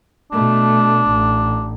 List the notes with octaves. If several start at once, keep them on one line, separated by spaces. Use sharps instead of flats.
B2 A3 D4
A1